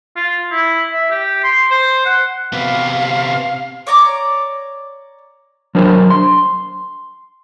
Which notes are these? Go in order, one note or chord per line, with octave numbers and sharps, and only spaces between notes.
F4
E4
E5
G4
C6
C5
F#5
C3 B3 F5
C#5 D5 A#5 D6
F#3 D4 A#4 C5
C6